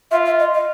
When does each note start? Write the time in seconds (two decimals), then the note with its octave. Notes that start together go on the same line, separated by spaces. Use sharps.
0.11 F4 E5
0.25 E5
0.39 D#5
0.54 D#5